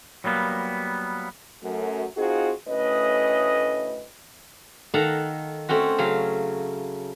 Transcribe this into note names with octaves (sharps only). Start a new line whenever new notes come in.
F#3 G3 A#3 B3
F#2 A3
C4 D#4 F4 F#4 G#4
D2 A2 C#4 B4 D#5
D#3 A4 F5 F#5 A5 A#5
A3 C4 C#4 F#4
C#3 F#3 F5